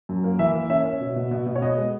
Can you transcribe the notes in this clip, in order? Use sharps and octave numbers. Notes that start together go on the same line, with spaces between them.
F#2
A#3
E3 E5
A#3
C#4 E5
C#4
B2
B2
B2
B2
C#5
B3 D#5
G#3